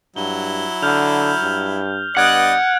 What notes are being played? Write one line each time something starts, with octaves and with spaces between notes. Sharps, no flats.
G2 F#3 E4 G7
D3 F6 G6 F7
G2
G2 B3 D5 D#5 F#5 F#6 G#6 D7